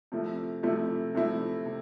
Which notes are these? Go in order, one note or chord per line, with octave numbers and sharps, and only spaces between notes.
C3 F3 A3 E4
C3 F3 A3 E4
C3 F3 A3 E4
C3